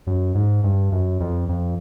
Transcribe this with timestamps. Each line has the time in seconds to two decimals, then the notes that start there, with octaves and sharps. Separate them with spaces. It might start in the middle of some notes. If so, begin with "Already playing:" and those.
0.07 F#2
0.35 G#2
0.64 G2
0.92 F#2
1.20 F2
1.49 F2